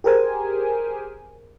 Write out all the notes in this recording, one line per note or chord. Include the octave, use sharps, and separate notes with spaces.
G4 G#4 A#4 C5 G#5